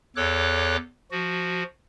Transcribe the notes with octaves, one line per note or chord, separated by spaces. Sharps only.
E2 A4 C#5 D6 F#6
F3 F#4